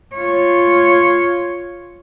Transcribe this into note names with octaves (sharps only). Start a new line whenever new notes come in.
F4 C#5